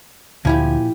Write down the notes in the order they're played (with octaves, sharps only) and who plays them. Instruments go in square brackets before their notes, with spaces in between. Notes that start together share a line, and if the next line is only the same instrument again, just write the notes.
[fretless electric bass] D2 [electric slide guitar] A#2 G#5 [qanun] F3 E4 G4